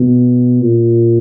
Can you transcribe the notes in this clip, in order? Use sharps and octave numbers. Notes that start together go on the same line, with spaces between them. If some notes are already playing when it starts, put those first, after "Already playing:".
Already playing: B2
A#2